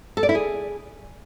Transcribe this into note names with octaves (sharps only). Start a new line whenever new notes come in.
A4
D5
E4
G#4